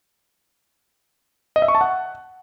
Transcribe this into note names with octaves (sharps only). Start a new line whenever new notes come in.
D#5
E5
C#6
A5
F#5